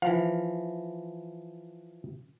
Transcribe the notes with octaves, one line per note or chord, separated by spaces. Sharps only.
E3 F3 F5